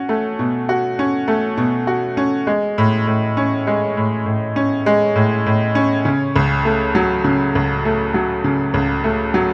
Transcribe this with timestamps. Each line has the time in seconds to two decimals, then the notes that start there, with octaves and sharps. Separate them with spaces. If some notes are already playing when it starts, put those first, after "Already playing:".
Already playing: C#4 F#4
0.09 A3
0.39 B2
0.69 F#4
0.99 C#4
1.28 A3
1.57 B2
1.87 F#4
2.17 C#4
2.47 G#3
2.78 A2
3.07 A2
3.37 C#4
3.67 G#3
3.97 A2
4.26 A2
4.56 C#4
4.86 G#3
5.16 A2
5.46 A2
5.75 C#4
6.05 C#3
6.36 C#2
6.65 A3
6.95 F#3
7.24 C#3
7.55 C#2
7.85 A3
8.14 F#3
8.44 C#3
8.74 C#2
9.04 A3
9.34 F#3